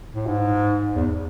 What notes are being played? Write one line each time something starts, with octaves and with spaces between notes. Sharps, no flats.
A2
G#2
E2